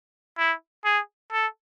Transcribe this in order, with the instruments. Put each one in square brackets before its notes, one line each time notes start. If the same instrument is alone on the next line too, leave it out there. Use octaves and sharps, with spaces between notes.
[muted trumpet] E4
G#4
A4